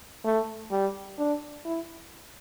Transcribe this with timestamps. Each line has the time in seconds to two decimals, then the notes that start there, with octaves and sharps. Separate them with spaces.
0.25 A3
0.72 G3
1.19 D4
1.65 E4